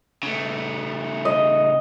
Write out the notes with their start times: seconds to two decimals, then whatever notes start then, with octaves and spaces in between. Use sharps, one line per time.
0.23 C#3 A3
1.25 D#5